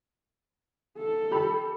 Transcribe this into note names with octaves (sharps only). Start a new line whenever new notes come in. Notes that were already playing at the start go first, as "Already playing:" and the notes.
A4
G4 B5